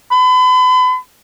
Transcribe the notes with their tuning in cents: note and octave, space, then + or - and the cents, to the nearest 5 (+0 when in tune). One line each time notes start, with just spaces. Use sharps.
B5 +40